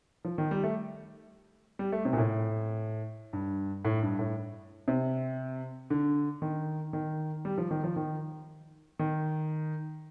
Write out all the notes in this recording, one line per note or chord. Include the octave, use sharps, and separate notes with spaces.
F3
D#3
G3
A3
G3
A3
C3
A#2
A2
G2
A2
G2
A2
C3
D3
D#3
D#3
G3
F3
D#3
F3
D#3
D#3